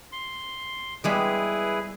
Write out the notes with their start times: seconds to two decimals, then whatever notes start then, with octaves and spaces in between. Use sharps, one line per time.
0.12 C6
1.04 G3 G#3 B3 E4 G#4 B4